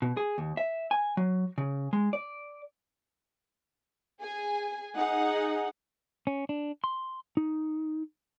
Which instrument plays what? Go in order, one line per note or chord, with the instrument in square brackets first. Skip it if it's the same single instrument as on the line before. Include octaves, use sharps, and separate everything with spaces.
[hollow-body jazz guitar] B2
G#4
D#2
E5
G#5
F#3
C#3
G#3
D5
[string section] G#4 G#5
D#4 G#4 F#5
[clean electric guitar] C#4
D4
C6
D#4